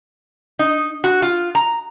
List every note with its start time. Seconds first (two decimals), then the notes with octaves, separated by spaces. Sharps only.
0.59 D#4
1.04 F#4
1.22 F4
1.55 A#5